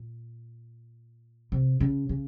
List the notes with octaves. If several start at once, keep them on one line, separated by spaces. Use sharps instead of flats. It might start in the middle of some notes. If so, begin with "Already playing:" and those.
Already playing: A#2
C3
C#3
C#3